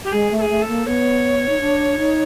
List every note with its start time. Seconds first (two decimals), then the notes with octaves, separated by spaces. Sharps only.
0.04 G4
0.11 G#3 G#4
0.31 A3
0.36 A4
0.40 G#4
0.50 A3
0.61 A4
0.68 A#3
0.86 B3 C#5
1.49 D#4
1.60 D4
1.98 D#4